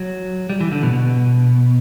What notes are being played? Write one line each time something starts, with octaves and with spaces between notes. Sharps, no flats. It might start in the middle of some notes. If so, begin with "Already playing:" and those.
Already playing: F#3
G3
E3
D3
B2
B2